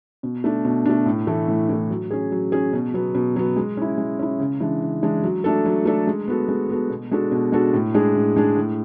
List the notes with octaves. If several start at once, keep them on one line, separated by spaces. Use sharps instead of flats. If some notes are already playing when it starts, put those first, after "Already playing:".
B2
A3 D4
B2
A3 D4
A2
E3 A3
A2
E3 A3
F#3
C#4 G#4
F#3
C#4 G#4
B2
F#3 B3
B2
F#3 B3
G#3
C#4 E4
G#3
C#4 E4
C#3
E3 G#3 D4
C#3
E3 G#3 D4
F#3
A3 D4 A4
F#3
A3 D4 A4
G#3
B3 F#4 A4
G#3
B3 F#4 A4
B2
G#3 D4 F#4 A4
B2
G#3 D4 F#4 A4
A2
G#3 D4 G#4
A2
G#3 D4 G#4
A2